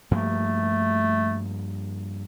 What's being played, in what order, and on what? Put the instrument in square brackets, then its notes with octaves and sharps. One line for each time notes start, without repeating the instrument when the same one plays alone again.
[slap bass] G2 F3 A#3 [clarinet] A3